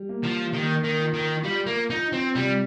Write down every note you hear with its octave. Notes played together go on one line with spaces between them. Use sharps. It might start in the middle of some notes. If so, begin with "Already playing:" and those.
Already playing: G3
A#3
F3
D#3 A#3
D#3
F3
D#3
G3 F4
A#3
F3 D#4
C4
C3 G3